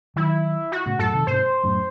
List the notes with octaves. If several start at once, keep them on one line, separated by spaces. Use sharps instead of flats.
D#3 F#3 E4
F#4
A2 C#3
F#2 A2 A4
C3 D#3
G#2 C3 C5
F#2 A2